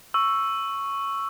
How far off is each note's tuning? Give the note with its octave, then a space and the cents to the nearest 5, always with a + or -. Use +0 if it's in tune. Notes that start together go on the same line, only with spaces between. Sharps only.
C#6 +0 E6 +5